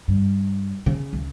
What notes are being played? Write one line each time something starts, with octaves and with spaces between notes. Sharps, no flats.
G2
C#3
C#2